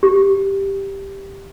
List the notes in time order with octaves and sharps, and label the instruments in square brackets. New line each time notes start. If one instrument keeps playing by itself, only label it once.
[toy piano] G4